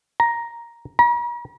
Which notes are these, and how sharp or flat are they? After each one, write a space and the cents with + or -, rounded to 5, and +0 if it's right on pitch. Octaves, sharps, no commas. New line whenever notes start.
A#5 +5
A#5 +45